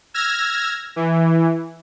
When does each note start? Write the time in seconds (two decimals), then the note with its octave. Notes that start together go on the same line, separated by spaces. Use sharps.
0.14 E6 F6 G#6 A#6
0.96 E3